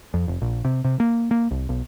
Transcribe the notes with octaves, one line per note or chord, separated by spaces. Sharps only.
F2
F1
A#1
C3
C3
A#3
A#3
C2
B1